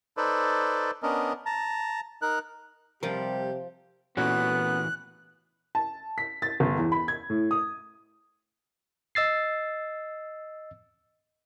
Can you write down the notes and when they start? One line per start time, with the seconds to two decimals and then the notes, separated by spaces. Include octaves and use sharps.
0.17 D#4 A4 B4 C5 D5
1.03 B3 C#4 D4 A#4 D#5
1.46 A5 A#5
2.22 D#4 A#4 F#6
3.03 C3 F3 G3 F4 G4 A#4
4.17 A#2 E3 A3 B3 C#4 F#4 F#6
5.75 A5
6.18 B6
6.42 A6
6.60 G1
6.77 E2
6.92 B5
7.08 G#6
7.30 A2
7.51 D#6
9.15 D#5 E6 A6 C7